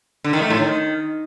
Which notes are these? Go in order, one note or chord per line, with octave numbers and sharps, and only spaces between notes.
D3
D#3
A3
A2
D#3